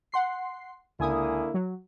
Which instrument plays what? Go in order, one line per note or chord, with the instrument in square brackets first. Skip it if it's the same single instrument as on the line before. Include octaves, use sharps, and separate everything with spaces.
[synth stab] F#5 C6 C7
[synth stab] C#2 G#5 D#6 [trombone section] D3 A#3 E4
[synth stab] F#3